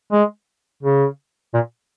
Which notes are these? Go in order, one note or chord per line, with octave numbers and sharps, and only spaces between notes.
G#3
C#3
A#2